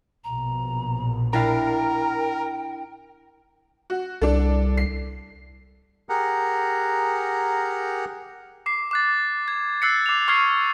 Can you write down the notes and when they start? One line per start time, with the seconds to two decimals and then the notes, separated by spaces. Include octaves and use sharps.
0.24 A#1 B2 A#5
1.33 D4 E4 A#4 F5 G5
3.90 F#4
4.21 C2 D4 A4
4.77 C7
6.09 G4 G#4 A#4 F#5 A#5
8.66 D6 C7
8.91 D6 F#6 A6
9.48 G#6
9.82 E6 F#6 A6 C7 C#7
10.06 D6 F7
10.28 C#6 F6 G#6 C7